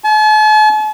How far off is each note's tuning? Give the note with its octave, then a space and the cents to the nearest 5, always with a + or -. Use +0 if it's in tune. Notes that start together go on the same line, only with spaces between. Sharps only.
A5 -45